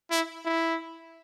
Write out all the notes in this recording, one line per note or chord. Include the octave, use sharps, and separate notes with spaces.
E4
E4